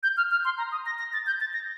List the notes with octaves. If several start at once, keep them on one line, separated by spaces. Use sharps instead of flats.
G6
F6
F6
C6
A#5
D#6
A#6
A#6
A6
G6
A6
A#6